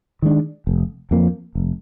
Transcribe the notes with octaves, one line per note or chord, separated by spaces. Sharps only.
D#3 G#3 D4
F1
F2 F3 A#3
F1